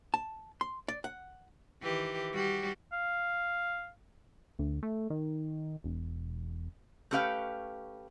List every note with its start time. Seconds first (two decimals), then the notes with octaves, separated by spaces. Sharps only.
0.14 A5
0.61 C6
0.88 D5
1.04 F#5
1.82 D#3 E3 G4
2.33 G3 F#4 G4
2.93 F5
4.59 D2
4.83 A3
5.10 D#3
5.84 E1
7.11 A3 C#4 G4 B4 F5 G5